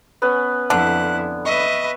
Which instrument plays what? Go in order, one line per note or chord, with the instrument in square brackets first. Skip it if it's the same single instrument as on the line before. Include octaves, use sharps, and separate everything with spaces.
[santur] B3 C#4 B4
[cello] F2 E4 [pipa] D3 [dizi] F#6
[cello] B4 E5 [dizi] D#5 [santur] C#6